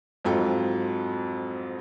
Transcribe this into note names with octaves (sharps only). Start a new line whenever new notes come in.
F2 G#2 F#3 F4 A4 G5